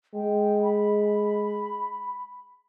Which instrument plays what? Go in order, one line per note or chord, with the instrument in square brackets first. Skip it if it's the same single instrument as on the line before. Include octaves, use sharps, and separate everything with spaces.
[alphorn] G#3 [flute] G5
[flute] B5